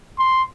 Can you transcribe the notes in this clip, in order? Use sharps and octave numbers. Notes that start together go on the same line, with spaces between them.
C6